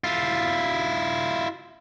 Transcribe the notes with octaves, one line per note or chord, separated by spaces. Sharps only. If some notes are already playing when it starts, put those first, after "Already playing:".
E4 F4